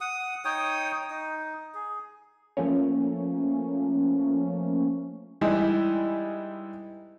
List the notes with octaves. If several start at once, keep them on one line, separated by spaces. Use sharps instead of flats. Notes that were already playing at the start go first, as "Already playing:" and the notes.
F#5 D#6
D#4 C#5 G5 D#6
D#4
G#4
F3 A3 A#3 C#4
E3 G3 G#3 D#4 E4 G#4